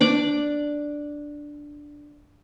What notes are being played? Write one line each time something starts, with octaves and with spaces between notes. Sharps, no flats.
D4 D5 D6